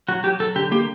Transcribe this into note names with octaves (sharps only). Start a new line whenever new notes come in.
F#3 F#4
F#3 G4
F#3 A4
D3 G4
A#3 G4